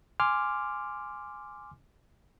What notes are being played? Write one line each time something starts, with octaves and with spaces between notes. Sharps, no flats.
G#5 C6 D6 F6